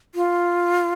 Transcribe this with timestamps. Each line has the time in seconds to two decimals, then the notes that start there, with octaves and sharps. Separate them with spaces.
0.15 F4